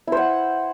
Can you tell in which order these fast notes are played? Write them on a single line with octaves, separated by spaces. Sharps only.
E4 C5 F#5